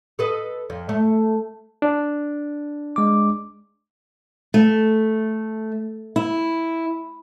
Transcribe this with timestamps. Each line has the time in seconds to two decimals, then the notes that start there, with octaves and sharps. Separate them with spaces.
0.19 A4 B4 D#5
0.70 F2
0.89 A3
1.82 D4
2.96 G#3 D6
4.54 A3
6.16 E4